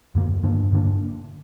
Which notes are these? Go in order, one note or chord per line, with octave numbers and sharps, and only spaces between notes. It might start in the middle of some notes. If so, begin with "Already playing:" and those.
F#2 D3 A#3
G2 D3 A#3 D4
G2 D3 A#3 D4